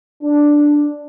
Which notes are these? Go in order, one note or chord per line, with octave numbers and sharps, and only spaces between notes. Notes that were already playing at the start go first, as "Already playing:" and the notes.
D4